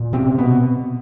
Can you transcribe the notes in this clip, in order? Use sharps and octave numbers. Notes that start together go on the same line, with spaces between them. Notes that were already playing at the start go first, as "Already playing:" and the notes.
Already playing: A#2
C3 C4
B2 B3